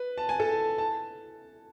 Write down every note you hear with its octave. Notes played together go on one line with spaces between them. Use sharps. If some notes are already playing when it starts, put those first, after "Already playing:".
Already playing: B4
A5
G#5
A4 A5
A5